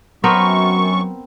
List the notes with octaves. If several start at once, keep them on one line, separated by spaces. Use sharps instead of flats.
F#2 F#3 B3 C4 A#4 C#6